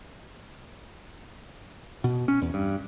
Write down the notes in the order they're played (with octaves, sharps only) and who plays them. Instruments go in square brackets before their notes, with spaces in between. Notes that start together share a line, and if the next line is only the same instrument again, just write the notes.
[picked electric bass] B2
C#4
E2
G2